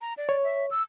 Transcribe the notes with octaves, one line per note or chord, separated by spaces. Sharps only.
A#5
D5
C#5
E5
E6